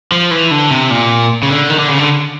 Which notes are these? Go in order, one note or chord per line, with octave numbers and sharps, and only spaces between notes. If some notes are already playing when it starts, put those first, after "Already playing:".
F3
E3
D3
C3
A#2
C#3
D3
D#3
D3
C#3
D3